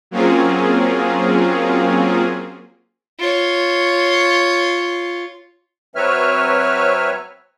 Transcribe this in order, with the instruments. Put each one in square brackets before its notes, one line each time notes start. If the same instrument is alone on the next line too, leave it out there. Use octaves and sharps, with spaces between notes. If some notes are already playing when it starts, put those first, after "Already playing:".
[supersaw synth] F#3 A#3 C4 C#4 F4 G#4
[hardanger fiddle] F4 C#5
[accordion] F#3 C4 B4 C#5 E5 F6